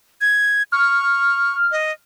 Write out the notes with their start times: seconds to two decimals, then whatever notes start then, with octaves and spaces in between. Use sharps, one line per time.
0.21 G#6
0.72 C#6 F6
1.72 D#5